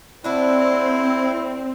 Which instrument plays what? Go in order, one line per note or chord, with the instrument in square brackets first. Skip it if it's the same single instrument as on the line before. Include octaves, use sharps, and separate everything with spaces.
[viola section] C4 [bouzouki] D4 F#4 A4 [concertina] E4